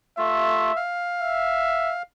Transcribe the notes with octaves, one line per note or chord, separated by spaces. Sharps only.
A3 F4 E5
F5
E5